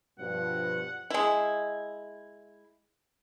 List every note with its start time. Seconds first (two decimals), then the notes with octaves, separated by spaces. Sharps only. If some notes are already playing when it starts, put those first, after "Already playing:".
0.19 G2 B2 F3 F#5
1.10 G#3 E4